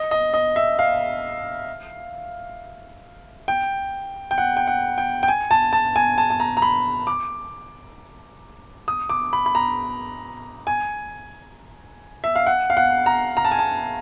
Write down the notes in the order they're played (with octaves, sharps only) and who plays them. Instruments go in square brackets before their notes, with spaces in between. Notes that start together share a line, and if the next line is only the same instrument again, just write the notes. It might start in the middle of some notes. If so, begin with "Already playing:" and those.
Already playing: [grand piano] D#5
D#5
D#5
E5
F5
G5
G5
F#5
G5
F#5
G5
G5
G#5
A5
A5
G#5
A5
A5
A#5
A#5
B5
D6
D#6
D6
B5
B5
A#5
G#5
E5
F5
F#5
F5
F#5
A#5
A#5
A5
G#5
A5